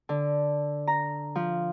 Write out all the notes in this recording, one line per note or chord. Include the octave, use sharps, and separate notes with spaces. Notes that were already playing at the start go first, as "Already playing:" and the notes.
D3
A#5
F3